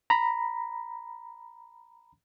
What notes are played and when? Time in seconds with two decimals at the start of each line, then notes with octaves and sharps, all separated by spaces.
0.10 A#5 B5